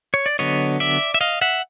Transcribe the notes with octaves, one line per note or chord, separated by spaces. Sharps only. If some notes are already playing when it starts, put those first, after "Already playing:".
C#5
D5
D3 F#3 B3 C#5 D#5
D5 E5
E5
D#5 F5
E5 F#5